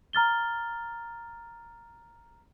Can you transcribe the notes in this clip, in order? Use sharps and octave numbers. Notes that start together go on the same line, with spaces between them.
A#5 F6 A6 G7